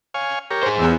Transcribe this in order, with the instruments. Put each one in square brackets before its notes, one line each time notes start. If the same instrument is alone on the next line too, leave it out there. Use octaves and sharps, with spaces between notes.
[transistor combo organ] C#5 F5 G#5
G4 A#4 C#5
[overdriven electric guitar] G#4 C5
[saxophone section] E2 [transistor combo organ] E4